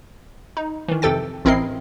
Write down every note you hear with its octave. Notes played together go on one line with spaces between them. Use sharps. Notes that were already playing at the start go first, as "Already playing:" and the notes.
D#4
D#3 E3
F2 C3 A4 G5 A6
A1 C4 E4 A#4 D#5 C7